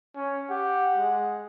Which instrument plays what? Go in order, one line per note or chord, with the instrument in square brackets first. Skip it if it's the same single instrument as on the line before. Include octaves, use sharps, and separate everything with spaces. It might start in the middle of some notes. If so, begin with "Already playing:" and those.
[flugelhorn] C#4
[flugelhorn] G4 [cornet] F#5
[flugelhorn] G#3